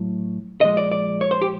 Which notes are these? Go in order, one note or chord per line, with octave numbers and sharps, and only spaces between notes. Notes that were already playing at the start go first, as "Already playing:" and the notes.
Already playing: A2 F#3
A#2 F3 G#3 D#5
D5
D5
C#5
C5
G4